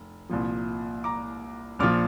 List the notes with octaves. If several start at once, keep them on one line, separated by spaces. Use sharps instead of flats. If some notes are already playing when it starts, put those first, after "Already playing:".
Already playing: F1
C2 A#2 F3
A#5 D6
A#1 A#2 F3 D6 F6